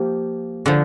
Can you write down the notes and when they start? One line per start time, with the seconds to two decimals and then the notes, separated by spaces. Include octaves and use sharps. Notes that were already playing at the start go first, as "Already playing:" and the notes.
Already playing: F3 A#3 G4
0.66 D3 F3